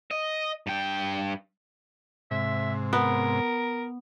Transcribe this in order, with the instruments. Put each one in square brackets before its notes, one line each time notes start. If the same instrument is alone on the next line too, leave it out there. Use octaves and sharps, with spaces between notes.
[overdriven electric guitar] D#5
G2 G5
[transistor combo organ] G#2 C3 [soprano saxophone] E5
[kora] B3 [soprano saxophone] A#4